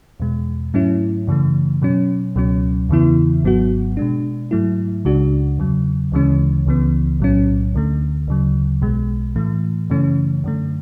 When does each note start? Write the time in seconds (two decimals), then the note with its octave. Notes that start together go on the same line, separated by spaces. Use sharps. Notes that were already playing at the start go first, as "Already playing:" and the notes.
0.20 E2 B2 G#3
0.74 G#2 F#3 A3 C#4 E4
1.27 F#2 C#3 E3 A3
1.82 B2 F#3 C#4
2.36 C#2 B2 F#3 C#4
2.89 E2 C#3 E3 B3 E4
3.43 G#1 G#2 F#3 B3 F#4
3.97 B2 G#3 D4
4.51 G#2 F#3 A3 E4
5.05 C#2 C#3 G#3 D4 F#4
5.58 E2 C#3 F#3
6.12 D2 C#3 E3 G#3 C#4
6.66 C#2 C#3 E3 B3
7.20 B1 A2 F#3 C#4
7.74 D2 D3 A3
8.28 D2 C#3 F#3
8.82 B1 B2 G#3
9.36 A2 E3 A3
9.90 F#2 C#3 E3 A3 C#4
10.44 F#2 D3 A3